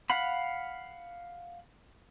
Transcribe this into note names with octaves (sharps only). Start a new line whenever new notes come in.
F5 F#5 B5